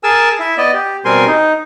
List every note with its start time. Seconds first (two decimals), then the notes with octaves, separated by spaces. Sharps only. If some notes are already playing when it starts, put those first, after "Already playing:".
0.04 G#4 A#4 G#5 A5 E6
0.40 E4 E5
0.58 B3 D5 D#5
0.73 G4
1.05 B2 G3 C4 A#4 G#5 C6
1.27 D#4